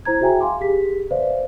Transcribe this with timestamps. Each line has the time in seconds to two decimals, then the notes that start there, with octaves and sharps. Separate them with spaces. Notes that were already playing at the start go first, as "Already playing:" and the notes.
0.05 E4 C5 A#5 G#6
0.21 F#4 G#4 E5 G5 G#5 A#5
0.41 F5 G#5 C6 D6
0.61 G4 G#4 B6
1.11 B4 C5 D5 E5 F5